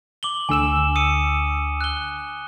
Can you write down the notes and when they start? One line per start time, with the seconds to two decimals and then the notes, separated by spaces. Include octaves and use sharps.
0.23 D6 F#7 G7
0.49 D2 D3 G#5 E6 E7
0.96 D#6 C#7 D#7
1.81 F#6 G7